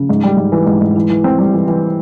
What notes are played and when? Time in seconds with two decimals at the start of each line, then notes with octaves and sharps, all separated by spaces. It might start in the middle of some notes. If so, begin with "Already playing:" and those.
Already playing: C#3
0.09 G#2
0.23 G3
0.37 G#2
0.52 E3
0.66 G#2
0.81 G#2
0.96 E3
1.10 E3
1.24 C4
1.39 G3
1.53 E3
1.68 E3